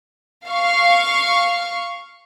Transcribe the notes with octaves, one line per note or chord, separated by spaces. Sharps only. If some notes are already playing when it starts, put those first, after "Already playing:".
F5 C#6